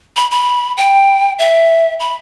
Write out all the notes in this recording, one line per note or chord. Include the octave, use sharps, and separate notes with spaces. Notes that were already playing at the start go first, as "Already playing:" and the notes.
B5
B5
G5
E5
B5